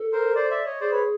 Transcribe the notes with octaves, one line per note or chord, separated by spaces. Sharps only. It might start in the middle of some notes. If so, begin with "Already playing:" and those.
Already playing: A4
A#4 C5
C5 D5
D5 E5
C#5 D#5
G#4 C5 D5
B4 C#5